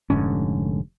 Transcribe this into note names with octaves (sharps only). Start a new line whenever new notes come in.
F1 G#2 D3 C#4